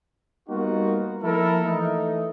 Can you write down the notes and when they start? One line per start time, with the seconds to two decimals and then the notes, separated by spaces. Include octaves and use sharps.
0.49 G3 A#3 B3 D#4 F4 F#4
1.23 F3 A3 A#3 E4 A4 A#4
1.66 E3 A3 D#4